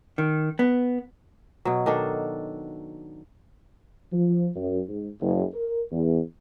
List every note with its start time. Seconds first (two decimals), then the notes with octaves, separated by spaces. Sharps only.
0.18 D#3
0.59 B3
1.65 B2 F#3
1.86 D#3 D4 A4
4.12 F3
4.55 F#2
4.88 G#2
5.21 F#1
5.53 A#4
5.92 E2